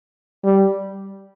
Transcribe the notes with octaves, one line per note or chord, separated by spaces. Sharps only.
G3